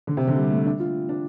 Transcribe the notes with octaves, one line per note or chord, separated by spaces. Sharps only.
D3
C3
D3
G3
A3
D4
F4
D4